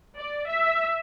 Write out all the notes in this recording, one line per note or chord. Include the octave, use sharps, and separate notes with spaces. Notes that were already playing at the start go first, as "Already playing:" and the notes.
D5
E5